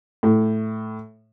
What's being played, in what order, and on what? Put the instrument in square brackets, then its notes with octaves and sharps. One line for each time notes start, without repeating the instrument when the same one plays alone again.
[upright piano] A2